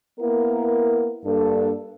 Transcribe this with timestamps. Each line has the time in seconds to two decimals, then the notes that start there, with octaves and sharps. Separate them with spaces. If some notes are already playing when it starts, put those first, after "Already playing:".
0.20 A#3 B3 E4 A#4
1.25 G2 A#3 D4 A4